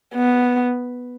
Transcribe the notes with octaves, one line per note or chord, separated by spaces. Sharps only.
B3